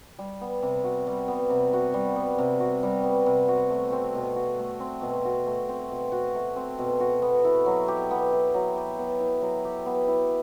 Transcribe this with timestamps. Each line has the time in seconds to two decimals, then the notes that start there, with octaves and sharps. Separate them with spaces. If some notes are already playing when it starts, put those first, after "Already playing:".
0.19 G3
0.41 B3
0.62 C3
0.84 F#4
1.07 G3
1.28 B3
1.50 C3
1.73 F#4
1.94 G3
2.16 B3
2.38 C3
2.60 F#4
2.83 G3
3.04 B3
3.26 C3
3.48 F#4
3.70 A3
3.92 C4
4.15 B2
4.36 F#4
4.59 A3
4.80 C4
5.02 B2
5.25 F#4
5.46 A3
5.69 C4
5.90 B2
6.12 F#4
6.35 A3
6.56 C4
6.78 B2
7.00 F#4
7.22 B3
7.45 E4
7.66 F#3
7.88 G4
8.11 B3
8.32 E4
8.54 F#3
8.77 G4
8.99 B3
9.20 E4
9.42 F#3
9.64 G4
9.86 B3
10.08 E4